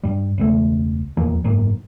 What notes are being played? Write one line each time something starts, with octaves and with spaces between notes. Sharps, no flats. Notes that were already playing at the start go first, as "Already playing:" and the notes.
G2 G3
E1 C#2 A3
D#1 E2 F3 A#3
F#1 G#2 A#3